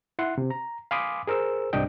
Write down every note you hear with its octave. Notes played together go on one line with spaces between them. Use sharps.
E4 F#5 C6
C3
A#5
F5 G#5 B5 C6 D6 D#6
G#4 A#4 C5 E6
C2 G#2 C3 D4 D#5 G5